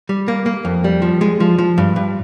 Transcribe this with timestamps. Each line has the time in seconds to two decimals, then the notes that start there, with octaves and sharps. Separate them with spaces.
0.09 G3
0.28 A#3
0.46 A#3
0.65 F2
0.84 G3
1.02 F3
1.21 G#3
1.40 F3
1.59 F3
1.78 G2
1.96 G2